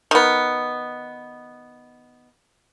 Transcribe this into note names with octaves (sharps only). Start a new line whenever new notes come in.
D#3 B3